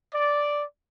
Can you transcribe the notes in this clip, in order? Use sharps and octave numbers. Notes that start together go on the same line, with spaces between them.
D5